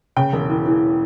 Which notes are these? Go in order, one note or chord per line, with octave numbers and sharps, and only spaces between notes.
C#3 G5
E1
E3
E3